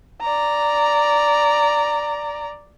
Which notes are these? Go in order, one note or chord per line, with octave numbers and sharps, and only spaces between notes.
D5 A#5